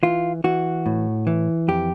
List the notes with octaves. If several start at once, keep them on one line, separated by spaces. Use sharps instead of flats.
E3 F4
E3 F#4
A2
E3
F2 G4